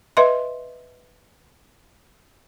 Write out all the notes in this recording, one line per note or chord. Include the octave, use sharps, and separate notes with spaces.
B4 D#5 E5 C6